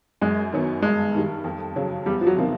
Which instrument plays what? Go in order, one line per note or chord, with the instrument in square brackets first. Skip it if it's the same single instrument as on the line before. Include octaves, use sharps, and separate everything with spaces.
[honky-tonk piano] F#2 [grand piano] G#3
[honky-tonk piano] D#3 F#3 B3 D#4
[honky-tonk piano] G2 [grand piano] G#3
[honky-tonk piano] D#3 G3
F2
C#3 F#3
[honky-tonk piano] E2 [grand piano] G3
[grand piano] F3
F#3
[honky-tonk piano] C3 F3 A#3 D#4